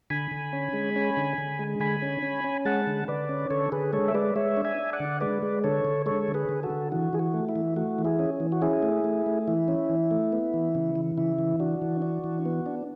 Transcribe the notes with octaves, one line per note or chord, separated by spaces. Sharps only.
D3 G#5 B5
D3
C#4
G#3
C#4
D3
D3
G#3
D3 G#5 B5
C#4
C#4
C#4
G#3 F#5 A5
D3
D3 B4 D5
C#4
D3 A4 C#5
D3 G#4 B4
G#3 A4 C#5
E5
G#3 B4 D5
G#3 C#5 E5
D4
E5 G#5
D4
D5 F#5
D3
G#3 B4 D5
G#3
D3 A4 C#5
D3
G#3 A4 C#5
D3
G#4 B4
D3
F#4 A4
D3
E3 F#4
E3 G#4
F#4
A3
E4
E3
A3 F#4
E3
E4 G#4
C#4
E3
F#4
C#4 E4 G#4
A3
A3
A3
E3 E4
C#4
E3
A3
B3
E3
C#3
E3
C#3 E4
E3
D4 F#4
E3
D4
E3
B3
D4